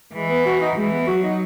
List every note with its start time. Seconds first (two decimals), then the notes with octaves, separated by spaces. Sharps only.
0.13 E3 G#3
0.29 B3
0.45 F#4
0.61 D#4
0.76 E3 G#3
0.92 B3
1.07 F#3 F#4
1.22 D#4